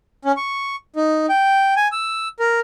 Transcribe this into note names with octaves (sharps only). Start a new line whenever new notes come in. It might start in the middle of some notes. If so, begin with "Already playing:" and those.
C#4
C#6
D#4
G5
G#5
E6
A#4